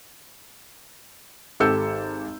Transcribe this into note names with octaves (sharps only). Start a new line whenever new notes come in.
G#1 G4 A4 E6 G6 C#7